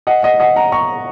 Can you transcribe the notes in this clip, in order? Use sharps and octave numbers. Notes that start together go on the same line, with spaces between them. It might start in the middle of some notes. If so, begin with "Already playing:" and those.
D#5 F#5
D#5 F#5
D#5 F#5
F#5 A#5
A#5 C#6